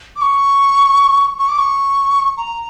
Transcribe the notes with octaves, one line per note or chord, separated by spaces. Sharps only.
D6
C#6
C#6
D6
C#6
A#5